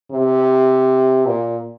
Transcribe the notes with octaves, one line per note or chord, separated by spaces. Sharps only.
C3
A#2